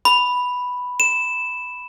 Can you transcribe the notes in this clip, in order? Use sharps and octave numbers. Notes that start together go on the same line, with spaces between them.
B5
E7